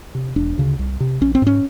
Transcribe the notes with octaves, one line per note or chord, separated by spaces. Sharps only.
C3
E1 D4
D2 C#3
C2
C3
A#1 C#4
C4
G#2 C#4